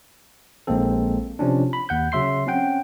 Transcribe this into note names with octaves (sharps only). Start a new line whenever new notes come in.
A#1 G#3 A#3 C4 A4
C3 F3 C#4 D4
B5
D#2 F#5 G6
C#3 F#3 E5 C6 C7
C4 C#4 F#5 G5